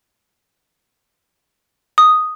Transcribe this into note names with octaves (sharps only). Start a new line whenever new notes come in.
D#6